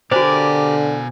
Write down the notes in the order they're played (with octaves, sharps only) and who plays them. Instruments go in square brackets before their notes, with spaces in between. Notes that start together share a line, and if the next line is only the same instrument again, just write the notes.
[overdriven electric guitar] B2 G#5 [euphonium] D3 [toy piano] F#4 C5 [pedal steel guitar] G4 A#4 D5